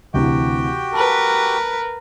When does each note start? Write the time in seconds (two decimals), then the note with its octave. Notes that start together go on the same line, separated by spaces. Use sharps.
0.14 D2 C3 E3 F#4 G4 G5
0.94 A#4 B4 A5